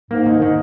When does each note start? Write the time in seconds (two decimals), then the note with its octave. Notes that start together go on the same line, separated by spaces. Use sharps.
0.11 G#2 A#3
0.26 D#3
0.42 D#3